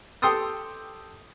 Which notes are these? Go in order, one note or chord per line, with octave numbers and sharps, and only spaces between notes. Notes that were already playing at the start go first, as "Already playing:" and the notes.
G4 A4 G5 C6 D#6 E6